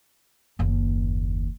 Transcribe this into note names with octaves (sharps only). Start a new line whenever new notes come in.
F#1 D#2